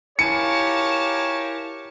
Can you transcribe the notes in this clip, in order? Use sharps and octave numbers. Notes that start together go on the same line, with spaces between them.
E4 F4 G4 A#4 C#5 G#5 A5 C#7